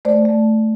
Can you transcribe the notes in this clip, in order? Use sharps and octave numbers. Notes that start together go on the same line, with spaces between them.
A3 C5 D5
A3